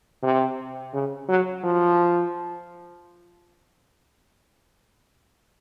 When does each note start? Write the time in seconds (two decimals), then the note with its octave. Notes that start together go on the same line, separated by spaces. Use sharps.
0.23 C3
0.93 C#3
1.29 F#3
1.64 F3